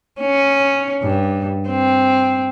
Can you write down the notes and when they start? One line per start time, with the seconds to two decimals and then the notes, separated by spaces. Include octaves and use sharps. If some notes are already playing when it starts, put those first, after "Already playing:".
0.21 C#4
1.02 G2
1.69 C4